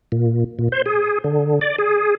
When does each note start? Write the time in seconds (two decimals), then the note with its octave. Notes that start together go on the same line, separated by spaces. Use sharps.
0.12 A#2
0.59 A#2
0.72 C5
0.86 G#4
1.24 D3
1.61 D5
1.78 G#4